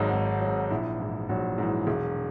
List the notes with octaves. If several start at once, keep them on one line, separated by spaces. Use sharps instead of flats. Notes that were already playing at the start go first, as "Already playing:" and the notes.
Already playing: G#1 G#2 F#3 D#4
G#1
F#3
G#2
A#1 E4
G#2 E3
A#1 F#3 F#4
G#2 E3
E1